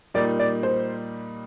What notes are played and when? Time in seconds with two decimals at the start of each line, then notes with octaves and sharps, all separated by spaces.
0.14 A#2 G3 A#3 D#4 D5
0.39 D5
0.63 C5